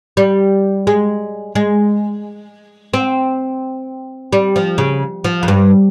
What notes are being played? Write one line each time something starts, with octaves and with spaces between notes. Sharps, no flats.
G3
G#3
G#3
C4
G3
F3
C#3
F3
F2
G2